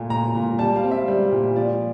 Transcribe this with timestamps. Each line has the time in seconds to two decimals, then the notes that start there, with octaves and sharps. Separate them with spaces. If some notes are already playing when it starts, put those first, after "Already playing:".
Already playing: A#2 A3
0.10 A#2 A#5
0.35 A#2
0.58 G3 A5
0.76 F5
0.83 C4
0.91 E5
1.08 G3
1.32 A#2
1.55 F3 D5